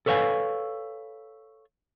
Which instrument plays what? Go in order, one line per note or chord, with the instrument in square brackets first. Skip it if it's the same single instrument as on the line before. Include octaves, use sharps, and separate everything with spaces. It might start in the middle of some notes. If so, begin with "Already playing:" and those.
[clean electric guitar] A4 B4 C#5 E5 F5 G#5